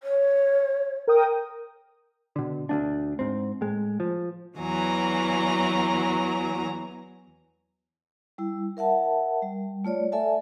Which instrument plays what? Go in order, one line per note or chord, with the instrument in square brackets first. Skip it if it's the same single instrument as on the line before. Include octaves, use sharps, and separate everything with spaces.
[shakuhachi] C#5
[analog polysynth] A#4 G5 D#6
[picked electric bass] B2 D3
D2 B3 D4
G#2 C4
A2 G#3
F3
[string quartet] E2 E3 F#3 G#5 A#5
[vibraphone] G3 E4
A#4 E5 F#5 A5
G3
A3 F4 C#5 D5
A4 D5 E5 G#5 A5